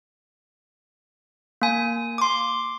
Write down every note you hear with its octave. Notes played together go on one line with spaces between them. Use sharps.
A#3 G#5
C6 D6